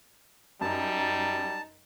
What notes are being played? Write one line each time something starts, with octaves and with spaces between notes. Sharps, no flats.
F#2 G3 D#4 A5 A#5